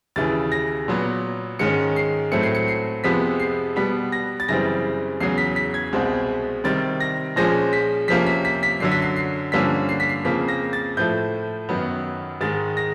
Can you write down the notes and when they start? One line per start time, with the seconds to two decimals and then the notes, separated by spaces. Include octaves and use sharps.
0.16 D#2 C#3 E3 A6
0.52 A#6
0.88 A#2 F#3 B3
1.59 G#2 D#3 G#3 C#4 C#7
1.96 C7
2.32 A2 F#3 A3 C4 C#7
2.43 C7
2.55 C#7
2.68 C7
3.04 F2 C3 F3 G#3 B3 B6
3.40 C7
3.76 B2 G3 B3 B6
4.12 A#6
4.40 A6
4.48 F#2 C#3 E3 G3 C4 A#6
5.20 E2 C#3 F#3 C7
5.38 B6
5.56 B6
5.74 G#6
5.93 C2 B2 G#3 C4
6.64 C3 D#3 G3 C4 A6
7.00 A#6
7.36 A#2 F3 G#3 C#4 A#6
7.73 B6
8.08 F2 C3 F3 A#3 C#4 B6
8.27 B6
8.45 B6
8.63 B6
8.80 F#2 D3 F#3 C7
8.92 B6
9.02 C7
9.16 C7
9.52 G2 D3 F3 A#3 C#4 B6
9.89 C7
10.00 B6
10.09 C7
10.25 F2 C#3 F3 A#3 B6
10.48 A#6
10.73 A6
10.97 A2 F3 A3 G6
11.69 F#2 D#3 F#3 B3
12.41 G#2 D#3 G#3 A6
12.77 A#6